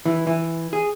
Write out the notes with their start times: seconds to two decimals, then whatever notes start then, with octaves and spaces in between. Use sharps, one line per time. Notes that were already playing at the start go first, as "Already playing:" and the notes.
0.05 E3
0.27 E3
0.73 G#4